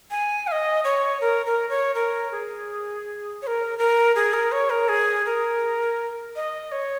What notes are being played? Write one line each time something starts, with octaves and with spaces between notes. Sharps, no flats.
G#5
F5
D#5
C#5
A#4
A#4
C#5
A#4
G#4
C#5
A#4
A#4
G#4
A#4
C#5
A#4
G#4
A#4
D#5
C#5